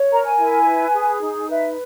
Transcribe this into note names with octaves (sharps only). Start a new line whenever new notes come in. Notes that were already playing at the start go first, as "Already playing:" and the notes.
Already playing: C#5
A#4 A#5
G#5
E4
B4
G#4
D#4
B4 E5